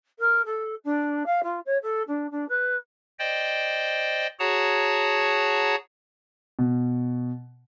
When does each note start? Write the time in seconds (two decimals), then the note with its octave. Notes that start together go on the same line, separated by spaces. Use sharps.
0.19 A#4
0.45 A4
0.84 D4
1.26 F5
1.43 F4
1.65 C#5
1.82 A4
2.07 D4
2.30 D4
2.48 B4
3.19 C5 D5 D#5 G5
4.39 F#4 G#4 C#5 F#5 A5 A#5
6.59 B2